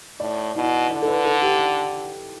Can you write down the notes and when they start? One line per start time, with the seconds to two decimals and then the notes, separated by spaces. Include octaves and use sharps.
0.20 A2 D5
0.55 B2 E4
0.90 D3 D5
1.02 A4
1.08 B4
1.25 A4
1.42 G4